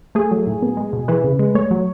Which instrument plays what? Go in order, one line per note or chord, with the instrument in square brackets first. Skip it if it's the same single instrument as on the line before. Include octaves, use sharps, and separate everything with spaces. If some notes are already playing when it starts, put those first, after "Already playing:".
[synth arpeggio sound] A3 G#4
F#3
A2
B3
G#3
B2
E3 B4
C#3
G#3
A3 C#5
F#3